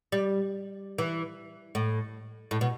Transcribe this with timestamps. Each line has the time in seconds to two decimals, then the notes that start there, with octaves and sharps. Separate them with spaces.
0.12 G3
0.98 E3
1.75 A2
2.51 A2
2.61 B2